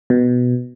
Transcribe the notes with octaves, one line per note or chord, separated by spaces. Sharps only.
B2